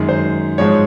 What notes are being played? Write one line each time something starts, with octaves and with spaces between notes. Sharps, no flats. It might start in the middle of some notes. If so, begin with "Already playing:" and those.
Already playing: F#2 D#3 G#3
C5
G#2 F3 G#3 C#5